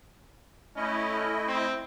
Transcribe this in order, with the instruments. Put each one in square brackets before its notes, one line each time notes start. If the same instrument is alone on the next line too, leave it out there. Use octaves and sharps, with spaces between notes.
[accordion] A3 E4 D#5 [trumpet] C#4
[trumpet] C4